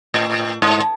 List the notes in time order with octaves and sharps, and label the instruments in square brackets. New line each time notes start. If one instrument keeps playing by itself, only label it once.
[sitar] A2
G#2